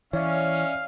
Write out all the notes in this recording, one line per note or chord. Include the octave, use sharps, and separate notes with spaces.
E3 C#4 C#5 D5 E5 F5